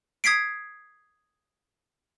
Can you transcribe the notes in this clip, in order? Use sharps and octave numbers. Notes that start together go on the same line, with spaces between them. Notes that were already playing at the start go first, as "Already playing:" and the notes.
D#6 G#6 B6 C7 D7